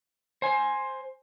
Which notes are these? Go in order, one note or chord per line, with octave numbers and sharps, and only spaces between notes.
C5 G#5